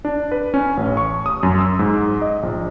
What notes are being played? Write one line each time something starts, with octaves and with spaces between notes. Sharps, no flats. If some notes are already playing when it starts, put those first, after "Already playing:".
D4
B4
C#4
A1
C#6
D#6
F#2
E6
G#2
D#5
A#1